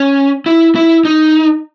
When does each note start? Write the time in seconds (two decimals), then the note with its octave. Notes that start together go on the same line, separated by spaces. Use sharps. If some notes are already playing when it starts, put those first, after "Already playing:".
Already playing: C#4
0.46 E4
0.75 E4
1.05 D#4